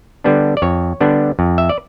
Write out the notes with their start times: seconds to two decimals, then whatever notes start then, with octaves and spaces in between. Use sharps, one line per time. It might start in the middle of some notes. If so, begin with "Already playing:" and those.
0.24 D3 G3 B3 D4
0.57 D5
0.62 F2 C#5
1.01 D3 G3 B3 D4
1.39 F2
1.58 E5
1.69 D5